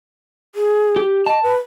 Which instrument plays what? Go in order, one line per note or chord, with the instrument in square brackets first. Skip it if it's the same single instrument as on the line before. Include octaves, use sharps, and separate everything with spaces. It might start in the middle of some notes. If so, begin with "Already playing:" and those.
[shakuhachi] G#4
[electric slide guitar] G4
[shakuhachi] D#5 [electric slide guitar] A5
[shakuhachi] B4